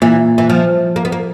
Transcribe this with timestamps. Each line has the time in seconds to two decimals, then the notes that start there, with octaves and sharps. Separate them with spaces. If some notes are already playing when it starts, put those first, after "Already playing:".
0.02 A#2 E3
0.38 E3
0.49 F3
0.96 A#3
1.05 B3
1.12 A#3